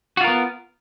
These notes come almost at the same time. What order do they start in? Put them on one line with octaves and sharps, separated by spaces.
F#4 F4 A#4 B3